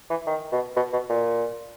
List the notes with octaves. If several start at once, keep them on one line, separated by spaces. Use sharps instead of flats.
E3
D#3
B2
B2
B2
A#2